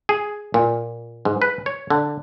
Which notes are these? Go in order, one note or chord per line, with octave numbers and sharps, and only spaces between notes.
G#4
A#2
G#2
B4
C#5
D3